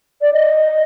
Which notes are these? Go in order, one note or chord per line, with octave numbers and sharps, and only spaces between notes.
D5
D#5